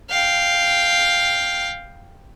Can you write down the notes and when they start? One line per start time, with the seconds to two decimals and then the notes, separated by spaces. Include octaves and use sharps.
0.10 F5 G5